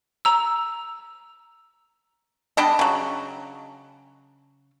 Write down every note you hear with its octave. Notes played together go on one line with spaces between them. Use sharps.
A#5 E6
G3 B3 D4 D#5
C#3 F#3